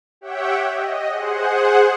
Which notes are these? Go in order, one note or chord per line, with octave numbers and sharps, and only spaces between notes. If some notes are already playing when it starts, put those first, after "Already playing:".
G4 C#5 E5 F#5 G5
D#5
G#4 C5 F#5